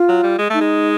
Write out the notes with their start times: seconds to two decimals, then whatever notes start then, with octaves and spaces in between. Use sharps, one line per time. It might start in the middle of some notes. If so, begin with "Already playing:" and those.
Already playing: F4
0.09 F#3
0.23 G3
0.38 G#3
0.50 A3 D#4
0.61 G#3